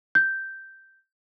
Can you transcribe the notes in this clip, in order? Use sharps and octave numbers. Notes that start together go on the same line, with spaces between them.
G6